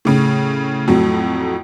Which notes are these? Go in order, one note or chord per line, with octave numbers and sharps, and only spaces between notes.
A2 C#3
F2 A2 F#3